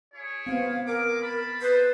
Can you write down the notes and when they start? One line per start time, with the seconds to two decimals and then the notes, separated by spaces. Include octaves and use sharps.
0.14 E4 G#4 C#5
0.47 B3 C4 F5
0.86 G#3 G#4 A#4 D6
1.22 A5 B5
1.61 A4 B4 C5